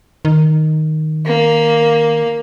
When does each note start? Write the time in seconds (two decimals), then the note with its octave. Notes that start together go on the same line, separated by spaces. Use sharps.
0.25 D#3
1.26 A#3